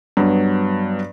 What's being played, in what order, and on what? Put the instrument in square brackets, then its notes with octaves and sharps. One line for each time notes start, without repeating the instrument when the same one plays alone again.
[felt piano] G2 F#3 B3